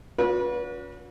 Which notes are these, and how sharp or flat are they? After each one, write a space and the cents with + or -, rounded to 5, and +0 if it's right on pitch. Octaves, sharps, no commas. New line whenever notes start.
C#4 +40 F#4 -40 B4 -30